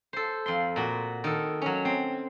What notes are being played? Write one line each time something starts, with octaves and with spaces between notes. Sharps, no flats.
A4 C5
F2 C6
A#2 F#4
D#3 A4
F#3 C#4
C4